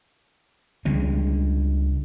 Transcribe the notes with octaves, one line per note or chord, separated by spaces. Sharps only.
C#2 D3 G3 G#3